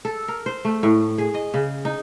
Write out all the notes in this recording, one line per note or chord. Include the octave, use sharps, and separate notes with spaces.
A4
A#4
C5
A3
A2
G#4
D#5
C#3
D#4